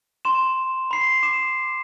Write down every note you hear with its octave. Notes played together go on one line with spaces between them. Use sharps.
C6 E7
B5 C7
D6 E7